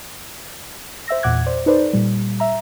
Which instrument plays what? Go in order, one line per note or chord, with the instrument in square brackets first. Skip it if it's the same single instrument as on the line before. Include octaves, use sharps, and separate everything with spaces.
[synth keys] C5 E5 E6 A#6
E2 A#2 F#5 D6 F#6 G#6
C5 D5
D#4 A4 B4 C5 D5
A#2 G3
E5 A#5